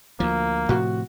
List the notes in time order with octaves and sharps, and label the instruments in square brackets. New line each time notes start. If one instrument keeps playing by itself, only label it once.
[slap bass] D2 F3 [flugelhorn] A#3
[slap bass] A2 C3 F3 [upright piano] F#4